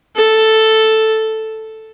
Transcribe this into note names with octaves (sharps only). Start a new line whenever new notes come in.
A4